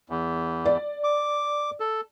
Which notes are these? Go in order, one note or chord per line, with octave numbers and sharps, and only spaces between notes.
E2
D5
D6
A4